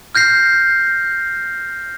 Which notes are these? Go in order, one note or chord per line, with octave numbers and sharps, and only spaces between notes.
F6 G6 A#6 C7